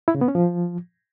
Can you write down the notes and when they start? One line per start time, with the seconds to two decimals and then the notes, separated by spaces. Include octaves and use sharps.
0.08 E4
0.15 C#3
0.21 B3
0.28 C#4
0.35 F3